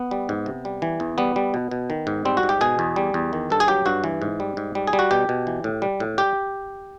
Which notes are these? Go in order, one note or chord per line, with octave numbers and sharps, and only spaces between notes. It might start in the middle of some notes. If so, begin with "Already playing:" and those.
Already playing: B3
G3
G#2
C3
G3
E3
E2
G3 B3
G3
B2
B2
D#3
G#2
G3 C4
F#4
G#2
G4
B2 G#4
E2
G3
E2
D#3
G2 A4
G#4
F#3 G4
G2 F#4
E3
G#2
G3
G#2
G3
G#4
G3
F#4
B2 G4
B2
E3
A2
G3
A2
G3 G4